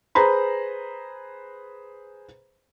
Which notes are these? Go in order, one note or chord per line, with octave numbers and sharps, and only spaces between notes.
G#4 B4 C5 A#5 B5